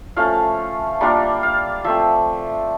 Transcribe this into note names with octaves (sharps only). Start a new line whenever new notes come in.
F3 A3 C#4 F5
G3 A#3 D4 F4
F5
F3 A3 C4 E5